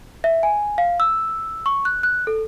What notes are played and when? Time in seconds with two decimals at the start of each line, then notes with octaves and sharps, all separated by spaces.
0.24 E5
0.43 G#5
0.78 F5
1.00 E6
1.66 C#6
1.85 F#6
2.03 F#6
2.27 A4